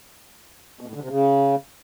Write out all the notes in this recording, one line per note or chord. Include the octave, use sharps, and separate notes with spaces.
B2
A2
D3
C3
C#3